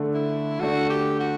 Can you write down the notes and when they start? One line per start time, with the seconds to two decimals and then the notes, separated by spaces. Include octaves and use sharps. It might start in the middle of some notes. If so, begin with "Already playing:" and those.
Already playing: D3 A3 D4
0.14 E4
0.59 D3 A3 D4 F#4
0.89 G4
1.20 F#4